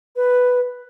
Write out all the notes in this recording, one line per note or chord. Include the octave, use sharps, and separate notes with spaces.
B4